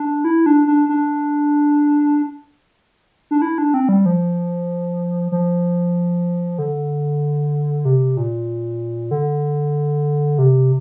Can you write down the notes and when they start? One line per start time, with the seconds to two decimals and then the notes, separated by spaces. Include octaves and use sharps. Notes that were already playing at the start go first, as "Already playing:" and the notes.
Already playing: D4
0.25 E4
0.46 D4
0.67 D4
0.89 D4
3.31 D4
3.42 E4
3.58 D4
3.74 C4
3.89 G3
4.06 F3
5.32 F3
6.58 D3
7.85 C3
8.17 A#2
9.11 D3
10.39 C3